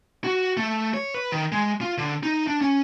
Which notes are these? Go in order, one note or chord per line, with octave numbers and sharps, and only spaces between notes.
F#4
A3
C#5
B4
D#3
G#3
F4
D3
D#4
D4
C#4